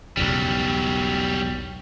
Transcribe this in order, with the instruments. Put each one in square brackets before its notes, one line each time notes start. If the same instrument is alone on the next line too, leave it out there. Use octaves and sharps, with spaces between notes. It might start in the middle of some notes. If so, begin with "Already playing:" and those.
[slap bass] B1 E2 C#3 [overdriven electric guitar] F#3 G3